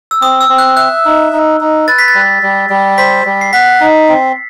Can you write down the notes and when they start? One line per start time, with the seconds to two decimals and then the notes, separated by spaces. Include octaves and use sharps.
0.11 E6
0.21 C4 D#6
0.41 E6
0.49 C4
0.58 F#6
0.76 E5 F#6
1.05 D#4
1.33 D#4
1.61 D#4
1.87 B4 A6
1.98 B6
2.08 A6
2.15 G3
2.43 G3
2.70 G3
2.98 C5 B6
3.26 G3
3.41 C7
3.53 F#5 B6
3.80 D#4
4.09 C4